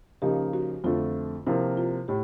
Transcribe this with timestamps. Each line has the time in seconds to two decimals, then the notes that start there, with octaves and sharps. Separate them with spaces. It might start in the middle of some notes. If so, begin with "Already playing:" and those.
0.22 C#3 F3 A#3 D#4 G4
0.53 F#4
0.84 F2 D3 F3 A3 F4
1.47 C3 F3 A#3 E4
1.77 F4
2.08 A2 G4